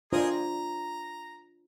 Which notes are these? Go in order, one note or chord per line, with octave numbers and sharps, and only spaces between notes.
D4 F4 G#4 A#4 C5 D#5
A#5